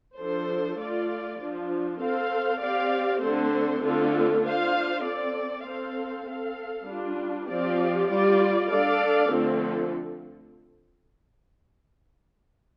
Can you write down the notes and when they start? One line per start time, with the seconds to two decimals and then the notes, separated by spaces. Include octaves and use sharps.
0.17 F3 D4 A4 C5
0.78 A3 F4 D5
1.39 F3 D4 F4
2.00 C4 A4 C5 F5
2.60 C4 G4 D5 F5
3.21 D3 A3 C4 A4 C5
3.82 D3 A3 C4 F4 A4
4.43 D4 F4 C5 F5
5.04 C4 A4 D5
5.65 C4 A4 C5 F5
6.26 C4 A4 F5
6.86 G3 D4 F4
7.47 F3 C4 G4 D5 F5
8.08 G3 F4 D5
8.68 D4 A4 D5 F5
9.30 D3 F3 A3 C4 A4